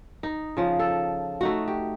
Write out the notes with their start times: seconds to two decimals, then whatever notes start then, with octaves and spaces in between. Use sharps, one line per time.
0.23 D#4
0.57 C#3 F3
0.79 A4
1.41 A3 D#4 F#4
1.68 G4